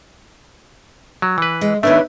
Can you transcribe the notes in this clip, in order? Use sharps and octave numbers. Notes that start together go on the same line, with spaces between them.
F#3
E3 B4
G#3
D#3 A3 B3 D4 B4 C#5 E5